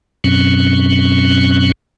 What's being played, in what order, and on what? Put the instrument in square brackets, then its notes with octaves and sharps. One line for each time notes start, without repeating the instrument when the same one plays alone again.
[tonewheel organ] F#2 B2 F#3 C4 C#4